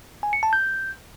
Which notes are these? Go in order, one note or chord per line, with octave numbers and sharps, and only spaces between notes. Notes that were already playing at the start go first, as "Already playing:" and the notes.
G#5
C#7
A5
G6